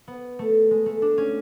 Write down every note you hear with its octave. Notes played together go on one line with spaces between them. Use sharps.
B3
A3
G#3
A3
D4
C#4